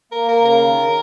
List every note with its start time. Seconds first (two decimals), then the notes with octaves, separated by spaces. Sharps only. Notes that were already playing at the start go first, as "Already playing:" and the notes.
0.12 A#3 A#4
0.29 A#4
0.37 C#3
0.45 A#4
0.61 D#3
0.86 D#3